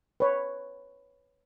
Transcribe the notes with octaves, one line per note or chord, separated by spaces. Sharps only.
B4 C#5